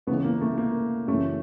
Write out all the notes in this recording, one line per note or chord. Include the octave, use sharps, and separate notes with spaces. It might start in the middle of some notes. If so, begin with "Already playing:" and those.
C#2 C#3 E3 A3 B3
A#3
A3
A#3
F#2 C#3 E3 A3